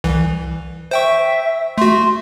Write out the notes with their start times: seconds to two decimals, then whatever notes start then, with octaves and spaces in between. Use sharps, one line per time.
0.04 C2 E3
0.91 C5 E5 G5 C#6
1.78 A3 F#4 C6